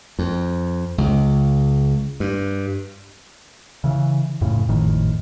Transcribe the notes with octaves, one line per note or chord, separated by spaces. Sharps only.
F2
C#2
G2
C#3 E3
F2 A2 C#3
G#1 F2 A2 D#3